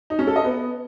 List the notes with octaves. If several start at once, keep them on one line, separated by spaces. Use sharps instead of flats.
D#4
C#4
A4
D#5
B3